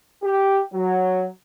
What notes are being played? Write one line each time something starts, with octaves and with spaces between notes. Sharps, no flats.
G4
F#3